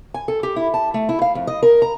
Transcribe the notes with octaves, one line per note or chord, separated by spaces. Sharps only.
G#5
A4
G4
E4
A5
A3
E4
F5
F2
D#5
A#4
A#5